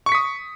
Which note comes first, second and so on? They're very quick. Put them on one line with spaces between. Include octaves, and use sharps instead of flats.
C#6 C#7 B6 D#6